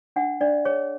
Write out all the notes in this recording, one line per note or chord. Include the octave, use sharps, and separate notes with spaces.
D4 F#5
D4 D5
G#4 C#5